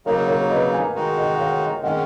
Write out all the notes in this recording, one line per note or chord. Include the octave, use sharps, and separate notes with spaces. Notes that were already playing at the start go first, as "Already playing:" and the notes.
C#3 F#3 A#3 D#4 A#4 C#5
A#4 C#5
B4 D#5
F5 G#5
D#3 G#3 D#4 F#4
D#5 F#5
F#5
C#5 F5
D#3 G#3 C#4 D#5 F#5